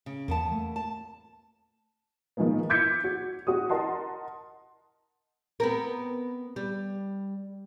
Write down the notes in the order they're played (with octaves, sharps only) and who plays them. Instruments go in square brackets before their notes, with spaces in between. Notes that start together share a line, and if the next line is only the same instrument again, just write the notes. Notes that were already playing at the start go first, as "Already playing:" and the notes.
[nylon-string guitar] C#3
[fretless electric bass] E2 [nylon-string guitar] A#3 B3 A5
[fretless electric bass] A3
[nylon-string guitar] A5
[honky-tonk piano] D#3 F3 G#3 A#3 B3
D6 E6 G6 G#6 B6 C#7
F#4
F#4 G4 D#6
A#4 D#5 F#5 A5 C6
[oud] B3 C4 A#4
G3